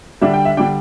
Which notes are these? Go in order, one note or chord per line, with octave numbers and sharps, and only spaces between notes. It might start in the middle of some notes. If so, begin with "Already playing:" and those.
D3 G3 D4 E5
G5
E5
D3 G3 D4 G5